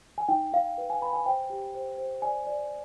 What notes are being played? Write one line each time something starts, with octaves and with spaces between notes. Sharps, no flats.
G#5
D#4 G5
D#4 F5
B4
G#5
B4 B5
G#5
C5 G5
G4
C5
C5
D5 G#5
D5